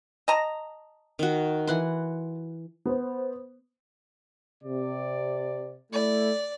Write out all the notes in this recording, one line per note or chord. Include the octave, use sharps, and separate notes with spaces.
D#5 A5 A#5
D#3 F#4
E3 F#5 C6
B3 C5
C3 D5
A3 E4 D5